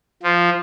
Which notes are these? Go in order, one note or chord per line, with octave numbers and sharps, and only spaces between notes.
F3